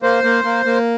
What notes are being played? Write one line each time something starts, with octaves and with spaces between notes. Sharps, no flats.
A#3 C5
A#3
A#3
A#3